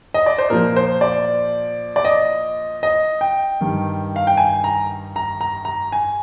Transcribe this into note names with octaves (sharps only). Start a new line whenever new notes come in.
D#5
D5
C5
A#2 F3 A#4
C5
D5
D5
D#5
D#5
G5
G2 D#3
F5
G5
G#5
A#5
A#5
A#5
A#5
G#5